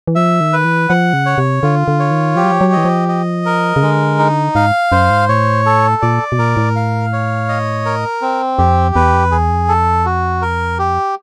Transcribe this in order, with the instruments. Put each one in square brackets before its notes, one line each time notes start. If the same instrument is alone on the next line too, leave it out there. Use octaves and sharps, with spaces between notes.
[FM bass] E3
[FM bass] F3 [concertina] E5
[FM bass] D#3
[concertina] B4
[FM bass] E3
[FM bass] F3 [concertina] F#5
[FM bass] C#3
[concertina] C#5
[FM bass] C3
[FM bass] D3 [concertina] F4
[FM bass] D3
[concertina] C#5
[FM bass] D#3
[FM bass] F3 [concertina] G4
[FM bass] F#3
F3
F#3
[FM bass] E3 [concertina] D#5
[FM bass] F3
[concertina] D#5
A#4
[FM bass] C#3
[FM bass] D3 [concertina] G#3
[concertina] D#4
[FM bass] G#2 [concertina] F5
[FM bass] F#2 [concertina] C5
[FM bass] G#2
[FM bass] A2 [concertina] C#5
[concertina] A4
[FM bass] A#2 [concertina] D5
[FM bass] B2
[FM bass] A#2 [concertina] A#4
[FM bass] A2
[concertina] F5
C#5
D#5
A#4
C4
[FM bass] F2 [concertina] G4
[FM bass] E2 [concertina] B4
[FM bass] F2
[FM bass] E2 [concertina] G#4
[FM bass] F2
[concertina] A4
F#4
A#4
G4